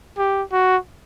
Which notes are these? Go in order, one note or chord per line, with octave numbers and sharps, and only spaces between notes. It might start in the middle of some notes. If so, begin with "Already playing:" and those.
G4
F#4